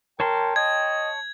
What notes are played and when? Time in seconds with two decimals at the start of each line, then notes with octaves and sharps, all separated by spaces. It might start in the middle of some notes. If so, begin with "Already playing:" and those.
0.20 A#4 C#5 G5 A5 C6
0.56 D#5 G#6